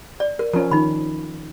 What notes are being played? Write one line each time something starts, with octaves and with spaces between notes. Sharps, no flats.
D5
A#4
F3 C#4 A#4
D#3 D#4 B5